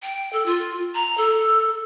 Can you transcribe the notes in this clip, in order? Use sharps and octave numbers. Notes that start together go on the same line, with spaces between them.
G5
A4
F4
A#5
A4